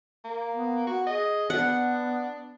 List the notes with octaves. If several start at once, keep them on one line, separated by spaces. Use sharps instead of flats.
A#3
B3
F#4
G#4 D#5
B3 D4 F#5